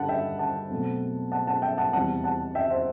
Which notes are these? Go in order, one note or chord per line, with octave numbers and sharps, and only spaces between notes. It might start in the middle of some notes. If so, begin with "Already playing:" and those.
Already playing: G2 D3 G3 F#5 A5 B5
E5 G5
F#5 A5
B2 F#3 A3 C4
F#5 A5
F#5 A5
E5 G5
F#5 A5
E2 C3 G3 C4 F#5 A5
F#5 A5
E5 G5
C5 E5